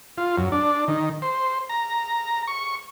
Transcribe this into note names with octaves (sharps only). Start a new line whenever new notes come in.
F4
F#2
D4
D#3
C5
A#5
C#6